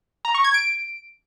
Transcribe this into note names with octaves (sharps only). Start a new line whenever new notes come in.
A#5
C#6
G#6
D7